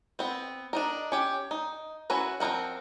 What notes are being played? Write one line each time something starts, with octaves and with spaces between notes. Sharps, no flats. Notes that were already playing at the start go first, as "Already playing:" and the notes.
B3 C4
D4 D#4 A#4
C#4 G4
D#4
C#4 E4 F#4 B4 A#5
F3 C4 D#4 A#4 F#5